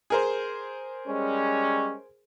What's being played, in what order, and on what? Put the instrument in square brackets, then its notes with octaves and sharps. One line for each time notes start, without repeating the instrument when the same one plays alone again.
[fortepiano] G#4 A#4 C5
[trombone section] G3 G#3 C#4